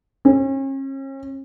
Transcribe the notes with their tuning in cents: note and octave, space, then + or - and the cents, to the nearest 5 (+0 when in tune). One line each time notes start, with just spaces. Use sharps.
C#4 -40